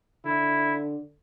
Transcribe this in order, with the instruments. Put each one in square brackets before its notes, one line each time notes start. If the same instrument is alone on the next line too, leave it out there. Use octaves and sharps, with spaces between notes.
[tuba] D3 [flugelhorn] E4